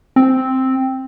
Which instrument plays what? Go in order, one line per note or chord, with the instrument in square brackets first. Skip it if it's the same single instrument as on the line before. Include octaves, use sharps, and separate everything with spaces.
[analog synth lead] C4